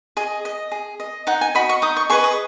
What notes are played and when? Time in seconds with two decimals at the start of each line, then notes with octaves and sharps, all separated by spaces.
0.17 G#4 D#5
0.45 D#5
0.71 G#4
1.00 D#5
1.27 D#4 F#5
1.41 G#5
1.55 F#4 D#5 B5
1.69 C#6
1.82 D#4 D#6
1.97 C#6
2.10 G#4 B4 D#5 C#6
2.24 D#6